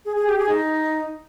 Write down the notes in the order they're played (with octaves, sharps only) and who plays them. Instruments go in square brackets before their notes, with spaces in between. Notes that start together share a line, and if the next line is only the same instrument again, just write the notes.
[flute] G#4
G#4
G4
G#4
D#4